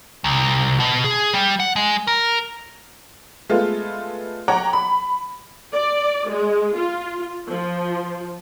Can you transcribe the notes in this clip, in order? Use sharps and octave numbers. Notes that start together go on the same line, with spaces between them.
C2
B2
G#4
G3
F#5
G#3
A#4
G#3 A3 B3 F4
C#5 F#5 G5 A#5 D6
B5
D5
G#3
F4
F3